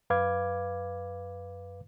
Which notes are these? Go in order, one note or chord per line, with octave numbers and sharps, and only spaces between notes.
F#2 B4 F5 D6 G#6